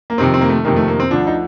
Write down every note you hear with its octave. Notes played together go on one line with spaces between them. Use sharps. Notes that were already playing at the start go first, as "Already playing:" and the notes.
A#3
F2 C3 D#3 C4
C4
A#3
A3
F2 C3 D#3 A#3
A3
A#3
C4
D2 D3 F3 D4
D#4